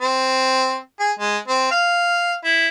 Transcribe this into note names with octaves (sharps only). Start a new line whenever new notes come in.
C4
G#4
G#3
C4
F5
E4